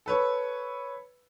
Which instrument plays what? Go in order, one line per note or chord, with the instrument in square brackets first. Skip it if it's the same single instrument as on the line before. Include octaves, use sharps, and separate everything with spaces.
[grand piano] A4 B4 C#5